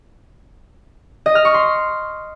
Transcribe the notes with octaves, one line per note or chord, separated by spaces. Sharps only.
D#5
F6
C#6
C6